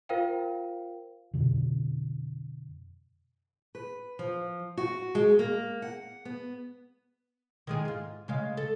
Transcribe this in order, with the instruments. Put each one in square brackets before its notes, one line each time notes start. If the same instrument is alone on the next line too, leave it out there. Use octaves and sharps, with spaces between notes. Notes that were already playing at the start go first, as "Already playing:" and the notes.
[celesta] F4 A#4 C5 F5 G5
[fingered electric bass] F2 B2 D3
[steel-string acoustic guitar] B4
F3
F#4
G#3
A#3
F#5
B3
[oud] D#3 G#3 G#4
G#2 F4
C#3 G#3 F5
A4